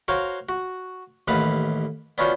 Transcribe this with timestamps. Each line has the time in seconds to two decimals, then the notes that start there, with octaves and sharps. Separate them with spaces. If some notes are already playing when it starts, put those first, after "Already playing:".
0.08 F#4 A#4 C5 C#5 F5
0.49 F#4
1.28 A1 D#2 B4 F5 F#5
2.18 B3 C#4 D4 F4 F#4 C5